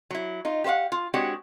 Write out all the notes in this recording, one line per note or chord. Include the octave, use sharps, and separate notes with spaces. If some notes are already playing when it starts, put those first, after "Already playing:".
F#3 E4
D#4 F4
G4 B4 C5 F5 F#5
F4
G#3 C4 D4 F#4 G4 C#5